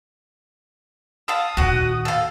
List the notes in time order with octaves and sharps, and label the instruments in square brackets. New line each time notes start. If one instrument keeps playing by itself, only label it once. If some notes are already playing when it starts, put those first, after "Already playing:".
[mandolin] F5 A5 E6 [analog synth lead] D#6
[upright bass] D#2 A#2 [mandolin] F#4 F#5
[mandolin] A4 F5